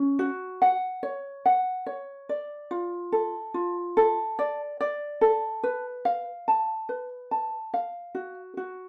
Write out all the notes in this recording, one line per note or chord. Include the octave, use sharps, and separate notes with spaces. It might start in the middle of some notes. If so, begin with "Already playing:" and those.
Already playing: C#4
F#4
F#5
C#5
F#5
C#5
D5
F4
A4
F4
A4
D5
D5
A4
B4
F5
A5
B4
A5
F5
F#4
F#4